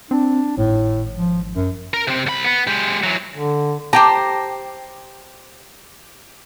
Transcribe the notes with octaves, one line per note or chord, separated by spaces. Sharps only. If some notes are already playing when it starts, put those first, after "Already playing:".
C4 D4
G#1 A2
F3
F#2
A#4
C3 C4
C2 B5
B3
G#3 G4
E3 F#3
D3
G4 C5 G5 A5 A#5